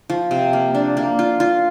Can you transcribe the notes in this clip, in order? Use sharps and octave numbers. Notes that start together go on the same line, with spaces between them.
F3
C3
A#3
D4
A#3
F4
F4